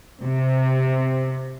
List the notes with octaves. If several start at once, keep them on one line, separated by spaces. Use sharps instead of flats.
C3